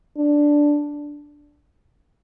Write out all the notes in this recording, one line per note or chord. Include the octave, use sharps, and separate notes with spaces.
D4